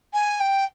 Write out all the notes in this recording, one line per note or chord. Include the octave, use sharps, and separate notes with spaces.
G#5
G5